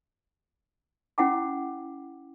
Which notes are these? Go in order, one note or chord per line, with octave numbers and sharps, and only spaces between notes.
C#4 E4 F#5 G5 D6